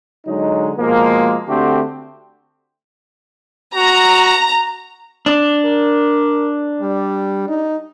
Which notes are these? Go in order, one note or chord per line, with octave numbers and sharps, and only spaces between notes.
D3 F#3 G#3 D#4
B2 F3 G#3 A#3
D3 A3 C4 F#4 G4
F#4 A#5
D4
A#4
G3
D#4